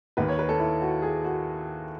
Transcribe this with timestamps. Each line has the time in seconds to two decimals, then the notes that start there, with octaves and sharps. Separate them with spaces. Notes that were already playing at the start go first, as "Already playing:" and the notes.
0.17 D#2 D#3 B4
0.28 C#5
0.39 B4
0.49 A4
0.60 E4
0.82 F#4
1.02 G#4
1.24 F#4